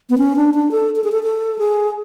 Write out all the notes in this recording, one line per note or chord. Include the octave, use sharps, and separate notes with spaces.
B3
C#4
D4
D4
A4
A4
G#4
A4
A4
G#4